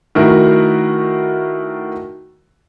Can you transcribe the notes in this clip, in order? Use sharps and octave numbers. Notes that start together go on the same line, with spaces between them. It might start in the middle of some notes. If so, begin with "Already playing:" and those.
D#3 A3 E4 F#4 A#4